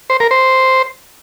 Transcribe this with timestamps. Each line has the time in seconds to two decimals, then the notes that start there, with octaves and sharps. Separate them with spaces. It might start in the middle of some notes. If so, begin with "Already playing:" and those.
0.10 C5
0.20 A#4
0.31 C5